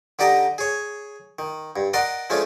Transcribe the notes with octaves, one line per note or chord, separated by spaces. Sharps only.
D3 D#4 G4 D5 D#5 A#5
G#4 C#5
D#3
G2
A#4 D5 D#5 F#5 C6
F3 G#3 A3 C#4 D4